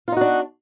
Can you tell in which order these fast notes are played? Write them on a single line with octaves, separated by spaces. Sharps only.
F4 D#4 F#4 D4